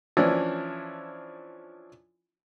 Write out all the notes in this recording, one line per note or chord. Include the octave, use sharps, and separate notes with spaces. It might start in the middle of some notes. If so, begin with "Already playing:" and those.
E3 F3 C#4 D4 E4